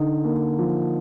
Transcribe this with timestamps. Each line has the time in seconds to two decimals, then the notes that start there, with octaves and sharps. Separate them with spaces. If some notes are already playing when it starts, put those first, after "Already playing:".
Already playing: D3 D#4
0.24 A#3
0.59 F3